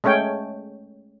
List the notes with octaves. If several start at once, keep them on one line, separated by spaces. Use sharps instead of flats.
G#3 A3 C#4 C#5 G5